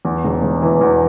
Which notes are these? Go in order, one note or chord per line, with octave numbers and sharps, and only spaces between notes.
E2
E1
E1
E3
E2